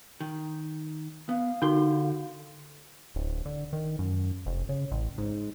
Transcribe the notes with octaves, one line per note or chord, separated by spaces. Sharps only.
D#3
B3 F5
D3 D#4 F#4 G5 C6
D1
D3
D#3
F#2
F1
C#3
A1
G#2